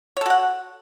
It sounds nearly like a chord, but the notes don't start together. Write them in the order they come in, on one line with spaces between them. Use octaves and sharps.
C#5 A4 F#4 F#5